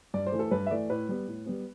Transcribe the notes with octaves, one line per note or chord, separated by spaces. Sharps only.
G2 D5
C5
E3 A3
A4
G2 B4
E5
E3 A3 D5
A2 B4
G3 B3
A2
G3 B3